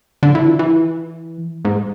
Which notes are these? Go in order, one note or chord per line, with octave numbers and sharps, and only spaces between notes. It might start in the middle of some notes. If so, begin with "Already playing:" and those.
D3
E3
F3
E3
G#2